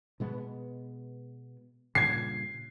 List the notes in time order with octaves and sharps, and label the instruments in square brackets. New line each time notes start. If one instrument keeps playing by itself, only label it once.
[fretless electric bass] B2 G#3 B3
[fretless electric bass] G2 A#2 C#3 [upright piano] G#6 C7